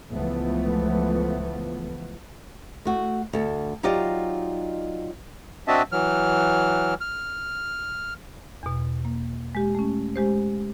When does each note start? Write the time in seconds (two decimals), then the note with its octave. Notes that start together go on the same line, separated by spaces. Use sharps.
0.13 C#2 E3 F3 A3 B3
2.85 A3 F#4
3.33 D2 A4
3.83 F#3 D#4 F4 G4 D5 D#5
5.68 C4 D4 F#4 D#5 E5 A5
5.92 E3 F#3 F6
7.01 F6
8.63 E2 B2
9.05 A#3
9.55 G#3 G4
9.75 A3 C#4
10.16 G#3 G4 C5